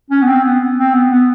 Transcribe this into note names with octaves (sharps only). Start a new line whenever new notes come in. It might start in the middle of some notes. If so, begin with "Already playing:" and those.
C#4
B3
C4
B3
C4
B3
B3